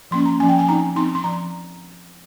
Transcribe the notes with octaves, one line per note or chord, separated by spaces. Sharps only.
F3 A#3 C#4 C6
A#5
F3 A#3 C#4 G#5
G5
G#5
F3 C4 D#4 A#5
F3 C4 D#4 C6
C6
F3 A#5